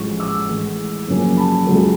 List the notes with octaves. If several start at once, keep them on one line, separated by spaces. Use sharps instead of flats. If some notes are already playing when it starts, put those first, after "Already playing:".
Already playing: A1 A2 F3 G#3 C#6
D6 E6
A2 E3 G#3
F#2 C#3 F3 A#3 C#4
A5 B5
C#2 C#3 F#3 A3